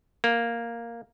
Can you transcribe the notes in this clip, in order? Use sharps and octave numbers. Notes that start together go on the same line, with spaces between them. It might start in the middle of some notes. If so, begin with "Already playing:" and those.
A#3